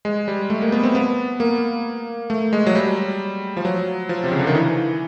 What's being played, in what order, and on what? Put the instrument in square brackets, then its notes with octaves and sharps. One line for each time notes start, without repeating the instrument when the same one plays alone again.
[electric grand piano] G#3
G3
A3
A#3
B3
C4
B3
A#3
A3
G#3
F#3
G3
F3
F#3
F3
C3
C#3
D3
D#3
E3